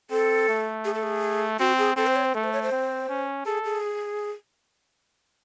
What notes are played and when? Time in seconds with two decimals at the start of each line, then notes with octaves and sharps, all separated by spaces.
0.10 C4 A4
0.48 A3
0.85 G#4
0.94 A4
1.03 G#4
1.59 C4 F#4
1.78 G#4
1.96 C4 A4
2.07 C5
2.16 C#5
2.25 C5
2.34 A3 A4
2.44 C5
2.53 C#5
2.63 C5
2.71 C4
3.09 C#4
3.46 G#4 A4
3.65 G#4